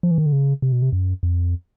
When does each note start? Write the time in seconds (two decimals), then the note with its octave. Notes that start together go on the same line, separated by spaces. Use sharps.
0.03 F3
0.11 E3
0.18 D#3
0.26 D3
0.32 C#3
0.62 C3
0.72 B2
0.82 C3
0.93 F#2
1.23 F2